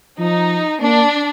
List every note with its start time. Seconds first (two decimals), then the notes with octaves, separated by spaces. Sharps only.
0.18 F3 D#4
0.81 A#3 D4